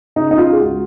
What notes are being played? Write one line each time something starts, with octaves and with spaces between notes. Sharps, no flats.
C#3 D#4
D#4
F4
G#4
C#2 F#4